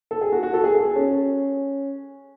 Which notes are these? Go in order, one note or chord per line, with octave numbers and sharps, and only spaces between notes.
A4
G#4
F#4
F#4
A4
G#4
A4
G#4
C#4